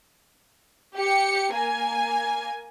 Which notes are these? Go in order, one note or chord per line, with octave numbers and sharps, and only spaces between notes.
G4 C#7
A#3 G#5